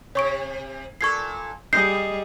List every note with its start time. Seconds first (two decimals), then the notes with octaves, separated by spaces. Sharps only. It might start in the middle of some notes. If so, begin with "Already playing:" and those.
0.15 C3 C#5 C#6 D7
1.01 A#2 A4 C#6 G#6 C7
1.73 G3 G#4 D#5 G6 C7